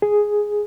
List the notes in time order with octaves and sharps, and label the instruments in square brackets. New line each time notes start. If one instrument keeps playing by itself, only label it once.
[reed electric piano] G#4